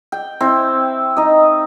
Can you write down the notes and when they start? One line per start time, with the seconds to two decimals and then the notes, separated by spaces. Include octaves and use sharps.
0.12 G5
0.40 C4 E4
1.17 D#4 D#5